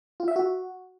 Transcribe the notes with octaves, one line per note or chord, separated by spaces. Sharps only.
F4
E5
F#4